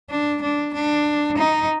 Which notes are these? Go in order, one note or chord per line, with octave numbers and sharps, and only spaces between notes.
D4
D4
D4
D#4